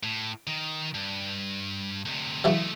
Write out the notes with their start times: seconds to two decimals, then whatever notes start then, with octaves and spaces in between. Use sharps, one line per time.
0.03 A2
0.47 D#3
0.95 G2
2.05 D2 C3
2.44 C#3 E3 F#3 G#3 A3